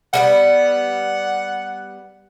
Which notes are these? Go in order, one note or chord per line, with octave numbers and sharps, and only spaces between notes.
G3 A#3 B3 F#5